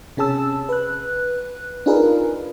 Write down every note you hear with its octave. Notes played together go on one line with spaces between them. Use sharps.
C3 C#4 G#4 A5 E6
B4 F#6
D4 D#4 F4 G#4 A#4 B4